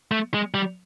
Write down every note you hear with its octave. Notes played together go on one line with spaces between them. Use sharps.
A3
G#3
G3